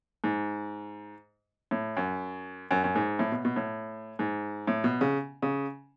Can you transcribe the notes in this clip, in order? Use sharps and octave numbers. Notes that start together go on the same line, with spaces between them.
G#2
A2
F#2
F#2
F#2
G#2
A2
B2
B2
A2
G#2
A2
B2
C#3
C#3